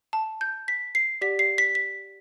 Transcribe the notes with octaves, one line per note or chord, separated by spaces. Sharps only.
A5
G6
B6
C7
G4 D5 F#5 B6
C7
B6
B6